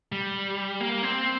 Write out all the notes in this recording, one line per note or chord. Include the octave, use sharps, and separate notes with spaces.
G3
A#3
C4